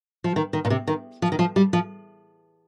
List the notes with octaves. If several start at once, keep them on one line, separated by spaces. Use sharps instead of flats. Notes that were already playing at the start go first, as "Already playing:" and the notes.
F3
D#3
D#3
A#2
C3
D#3
F3
D#3
F3
G3
F3